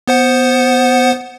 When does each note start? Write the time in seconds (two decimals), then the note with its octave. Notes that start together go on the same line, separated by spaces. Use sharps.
0.08 B3 C5 F#5